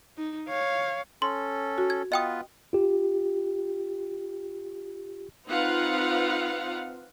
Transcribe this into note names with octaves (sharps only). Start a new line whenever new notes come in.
D#4
C#5 F5
C#4 A4 C6
F#4
G#6
B3 F4 B4 D#5 G5 D#6
F4 G4
C4 D#4 F4 B4 F5 F#5